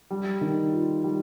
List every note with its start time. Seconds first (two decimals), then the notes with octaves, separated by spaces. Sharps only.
0.10 G3
0.41 D#3
0.72 F4
1.04 G3